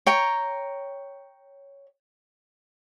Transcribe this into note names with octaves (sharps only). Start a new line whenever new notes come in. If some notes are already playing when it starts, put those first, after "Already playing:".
C#5 G5 A#5